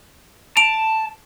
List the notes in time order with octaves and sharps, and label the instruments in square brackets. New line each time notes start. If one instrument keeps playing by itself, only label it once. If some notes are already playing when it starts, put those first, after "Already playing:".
[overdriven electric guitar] A5 [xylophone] D7 F7